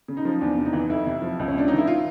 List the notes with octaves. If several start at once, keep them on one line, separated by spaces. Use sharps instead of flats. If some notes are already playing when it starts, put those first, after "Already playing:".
C#3
D#4
F3
E2 D4
C3
D#4
E3
F2 E4
C3
F3
C#2
C#4
C3 D4
E3 D#4
E4
F4